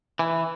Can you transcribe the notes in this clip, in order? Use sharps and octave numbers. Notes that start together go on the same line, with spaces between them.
E3